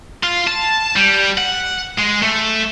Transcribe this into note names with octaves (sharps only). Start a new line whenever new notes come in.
F4
A5
G3
F#5
G#3
A3